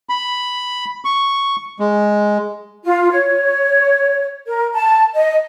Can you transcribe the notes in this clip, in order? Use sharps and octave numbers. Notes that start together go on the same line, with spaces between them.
B5
C#6
G#3
F4
C#5
A#4
A5
D#5